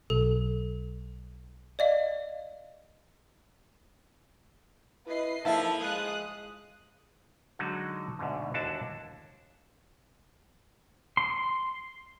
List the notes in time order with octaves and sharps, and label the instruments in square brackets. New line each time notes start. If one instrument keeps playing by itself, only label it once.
[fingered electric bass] B1 [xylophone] A4
[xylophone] D5 D#5 F5
[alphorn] E4 [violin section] B4 D#5 C7
[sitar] F3 E4 [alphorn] A#3 [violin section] A4 [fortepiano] E5 A5
[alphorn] G#3 [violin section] F5 D#6 F#6
[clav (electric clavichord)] D3 F#3 G#3 D#4 F#4
D2 G#2 B2 D3
D#2 D3 D4 E4 F#4 A5
[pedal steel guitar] C6